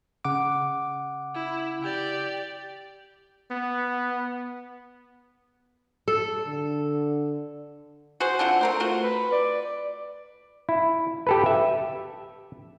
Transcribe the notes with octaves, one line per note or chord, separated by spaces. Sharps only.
C#3 F#5 D6
E4
G4 D5
B3
A4
D3
F#4 G#4 C5
D3 C4 F4 F#5
A3 C4 A#4 C5
C4 F4 F#4
B4
D5
E4
G4 A4 B4
E5